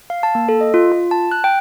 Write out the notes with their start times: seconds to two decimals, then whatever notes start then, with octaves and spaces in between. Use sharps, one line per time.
0.10 F5
0.23 A5
0.35 A#3
0.49 A4
0.61 D#5
0.74 F4
0.92 F4
1.11 A5
1.31 F#6
1.44 G5